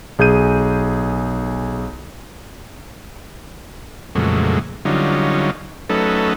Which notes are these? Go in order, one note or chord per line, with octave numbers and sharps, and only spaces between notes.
B1 G#4 G6 D#7
F2 A#2 C#3 F#3 G#3 A3
D3 F#3 G3 C#4 D#4 F4
F#3 A3 C#4 D#4 A4 B4